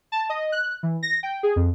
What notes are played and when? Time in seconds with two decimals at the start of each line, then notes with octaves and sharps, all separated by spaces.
0.12 A5
0.29 D#5
0.52 F#6
0.83 E3
1.03 A#6
1.23 G5
1.43 G#4
1.56 F2